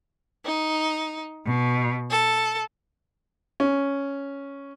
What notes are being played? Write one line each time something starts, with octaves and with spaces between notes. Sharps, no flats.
D#4
B2
A4
C#4